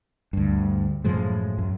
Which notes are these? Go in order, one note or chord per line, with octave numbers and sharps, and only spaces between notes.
D2 G2
F#2 A2 F3 G#3
F#2